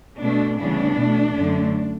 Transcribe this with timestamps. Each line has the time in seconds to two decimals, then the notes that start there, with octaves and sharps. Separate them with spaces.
0.20 B2 A3 D4
0.58 D2 C#3 E3 G3 B3 D4
0.97 B2 A3
1.36 F#2 D3 A3